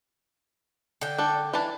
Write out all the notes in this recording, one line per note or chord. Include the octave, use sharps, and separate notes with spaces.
D3 G5
D4 A4
E3 D4 A5